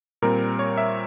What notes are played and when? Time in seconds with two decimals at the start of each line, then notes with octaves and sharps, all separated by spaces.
0.22 A#2 G3 C4 A#4
0.59 C#5
0.77 E5